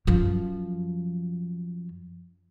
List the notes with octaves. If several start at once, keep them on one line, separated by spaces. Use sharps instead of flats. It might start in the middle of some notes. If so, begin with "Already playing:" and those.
F#2 F3